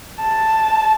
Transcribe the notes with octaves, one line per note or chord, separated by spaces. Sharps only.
A5